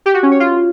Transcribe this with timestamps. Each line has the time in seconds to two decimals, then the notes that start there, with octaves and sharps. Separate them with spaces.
0.06 G4
0.14 F#4
0.23 C#4
0.31 C#5
0.40 F4